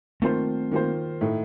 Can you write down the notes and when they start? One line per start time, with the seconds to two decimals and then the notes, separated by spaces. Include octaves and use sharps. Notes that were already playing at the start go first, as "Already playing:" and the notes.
0.22 D#3 A3 A#3 C4 F4 C5
0.71 D#3 A#3 F4 C5
1.21 A2 A3 D#4